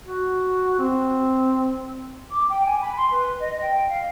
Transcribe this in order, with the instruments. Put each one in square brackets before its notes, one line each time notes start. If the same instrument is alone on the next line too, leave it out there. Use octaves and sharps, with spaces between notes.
[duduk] F#4
C4
[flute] D6
G5
G#5
B5
C6
B4
D#5
G5
F5